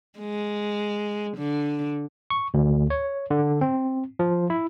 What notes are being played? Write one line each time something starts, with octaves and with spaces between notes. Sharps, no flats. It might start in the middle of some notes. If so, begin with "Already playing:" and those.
G#3
D3
C#6
D2
C#5
D3
C4
F3
E4